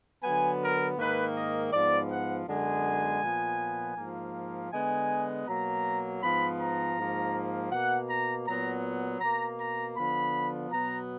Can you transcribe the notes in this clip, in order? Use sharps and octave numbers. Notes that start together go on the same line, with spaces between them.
D3 F#3 B3 G#5
A#4
G#2 D#3 A#3 B4
D#5
G#2 F3 B3 D5
F#5
F#2 D3 G#3 B3 G#5
A#2 F3 B3
G#2 F3 A#3
D3 G#3 B3 G#5
B2 F#3 A#3 A#5
G#2 F3 B3 B5
A#5
G#2 F3 A#3
B2 A#3 F#5
A#5
A#2 F#3 B3 A#5
B2 A#3 A#5
A#5
D3 F3 B3 B5
B2 F#3 B3 A#5